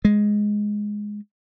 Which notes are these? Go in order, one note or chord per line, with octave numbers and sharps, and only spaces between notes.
G#3